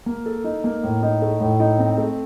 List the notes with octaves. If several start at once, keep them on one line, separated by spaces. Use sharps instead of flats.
A#3
A4
D#4
A#3
A2
D#4
A3
A2
D#4
C4
A3